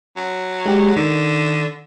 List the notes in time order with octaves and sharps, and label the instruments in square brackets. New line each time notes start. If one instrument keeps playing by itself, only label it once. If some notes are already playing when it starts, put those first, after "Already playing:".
[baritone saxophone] F#3
[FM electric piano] G#3 G4
[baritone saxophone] D3 [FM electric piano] D#3